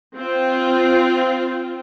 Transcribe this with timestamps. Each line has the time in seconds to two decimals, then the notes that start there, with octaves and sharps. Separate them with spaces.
0.16 C4 F4